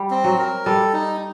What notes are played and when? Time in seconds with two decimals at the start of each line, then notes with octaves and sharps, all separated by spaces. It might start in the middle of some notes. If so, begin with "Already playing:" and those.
Already playing: G3
0.11 C4
0.24 F#3
0.38 A#4
0.65 G3 A4
0.93 D#4